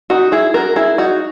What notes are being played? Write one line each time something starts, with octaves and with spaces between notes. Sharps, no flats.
D#4 F#4
E4 G#4
F#4 A#4
E4 G#4
D#4 F#4